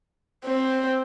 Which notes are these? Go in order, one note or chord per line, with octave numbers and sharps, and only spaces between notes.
C4